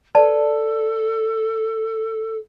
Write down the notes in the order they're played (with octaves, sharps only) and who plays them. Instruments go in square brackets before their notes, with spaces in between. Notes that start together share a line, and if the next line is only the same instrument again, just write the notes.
[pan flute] A4 [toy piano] B4 D5 A5